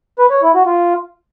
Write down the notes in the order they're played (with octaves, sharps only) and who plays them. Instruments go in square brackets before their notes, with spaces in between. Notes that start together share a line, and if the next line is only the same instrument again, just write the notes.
[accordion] B4
C#5
E4
F#4
F4